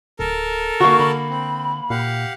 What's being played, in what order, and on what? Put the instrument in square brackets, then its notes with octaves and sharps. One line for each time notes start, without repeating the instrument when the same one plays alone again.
[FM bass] D1 [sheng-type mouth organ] A4 A#4
[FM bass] D3 [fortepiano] A#3 F#4 [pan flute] C#6
[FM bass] D3 [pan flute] B5
[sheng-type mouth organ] C4
[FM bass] A#2 [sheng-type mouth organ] G4 F5 F#5